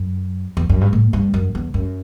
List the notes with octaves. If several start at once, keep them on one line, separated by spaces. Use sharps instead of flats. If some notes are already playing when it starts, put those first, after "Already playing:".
Already playing: F#2
E2
F#2
G2
A2
G2
F#2
E2
F#2